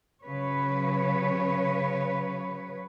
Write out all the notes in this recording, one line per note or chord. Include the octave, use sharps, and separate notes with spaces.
C#3 F#3 B4 C#5